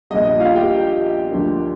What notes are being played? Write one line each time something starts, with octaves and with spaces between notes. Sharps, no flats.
A#1 A#2 G3 D#5
D#5
F4 F5
G4 G5
D2 D3 F3 A#3 D4